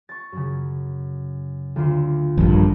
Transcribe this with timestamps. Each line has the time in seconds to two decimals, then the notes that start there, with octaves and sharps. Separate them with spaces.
0.09 C#6 A6
0.32 F#2 C#3
1.76 D2 F4 E5
2.38 D#1 A#1 G2 A3